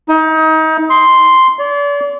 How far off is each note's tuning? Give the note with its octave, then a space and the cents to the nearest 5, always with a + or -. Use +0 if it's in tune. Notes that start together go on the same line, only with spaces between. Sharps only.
D#4 +30
C6 +0
D5 -40